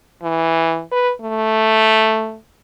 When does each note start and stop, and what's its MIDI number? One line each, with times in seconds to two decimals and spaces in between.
0.23 0.82 52
0.92 1.12 71
1.21 2.37 57